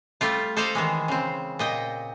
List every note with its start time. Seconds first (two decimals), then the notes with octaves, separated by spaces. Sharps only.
0.21 G3 A3 F4
0.57 A4 C5 D5 D#5 F5
0.75 D#3 E3 G#3
1.08 C#3 C4
1.59 A#2 D#5 G5